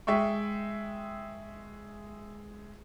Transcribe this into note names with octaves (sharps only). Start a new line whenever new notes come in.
G#3 E5 G5 C#6